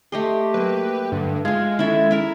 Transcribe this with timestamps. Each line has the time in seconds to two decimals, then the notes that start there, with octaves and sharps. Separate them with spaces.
0.12 A3 G4 D#5 C6
0.54 F#3 A#3 B4
1.12 G2 D3
1.45 G#3 F4 G#4 F5 G#6
1.79 D#3 C#4 E4 A4 E5
2.11 E4 A#4 E5